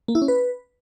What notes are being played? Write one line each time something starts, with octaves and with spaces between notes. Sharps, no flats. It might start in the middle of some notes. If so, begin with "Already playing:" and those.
A#3
E4
C#4
B4